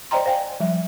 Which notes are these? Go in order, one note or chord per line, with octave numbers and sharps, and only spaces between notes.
C5 D5 D#5 G5 A#5 C6
C5 F5 G5 G#5
F3 G3 E5